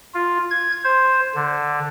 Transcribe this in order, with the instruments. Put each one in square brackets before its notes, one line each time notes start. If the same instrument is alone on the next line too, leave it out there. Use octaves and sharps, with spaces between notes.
[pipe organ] F4
G#6
C5
D3